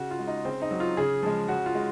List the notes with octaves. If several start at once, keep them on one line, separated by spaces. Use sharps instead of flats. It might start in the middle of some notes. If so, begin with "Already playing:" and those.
Already playing: C#3 F#4
F4
G#3
D#4
C#3 C4
D#4
F#3
F4
C#3 G#4
F3 G#3
C#3 F#4
F4
G#3